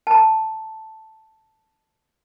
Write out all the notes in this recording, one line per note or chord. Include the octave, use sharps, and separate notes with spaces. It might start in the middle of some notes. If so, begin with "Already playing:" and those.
A5 A#5